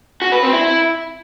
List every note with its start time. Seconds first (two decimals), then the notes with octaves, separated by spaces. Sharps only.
0.22 F#4
0.32 B4
0.42 C4
0.53 E4